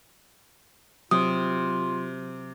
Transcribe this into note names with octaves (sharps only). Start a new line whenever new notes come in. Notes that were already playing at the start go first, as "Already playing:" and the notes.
C3 F#3 F4 D#6